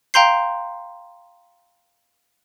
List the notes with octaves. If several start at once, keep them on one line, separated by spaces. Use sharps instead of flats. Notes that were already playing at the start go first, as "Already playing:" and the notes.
F5 G5 A#5 C6 G6 C7